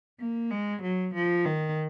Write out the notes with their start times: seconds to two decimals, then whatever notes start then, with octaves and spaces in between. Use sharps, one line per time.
0.20 A#3
0.51 G#3
0.82 F#3
1.14 F3
1.45 D#3